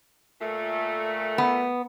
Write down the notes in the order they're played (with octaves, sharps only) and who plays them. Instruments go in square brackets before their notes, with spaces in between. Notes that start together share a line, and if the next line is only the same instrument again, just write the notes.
[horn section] A#2 A3
[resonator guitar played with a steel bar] B3